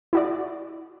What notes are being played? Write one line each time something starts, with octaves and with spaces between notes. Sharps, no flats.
E4 F#4 D5